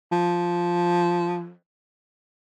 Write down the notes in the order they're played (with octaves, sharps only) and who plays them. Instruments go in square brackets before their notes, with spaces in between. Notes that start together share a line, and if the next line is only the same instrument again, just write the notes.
[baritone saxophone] F3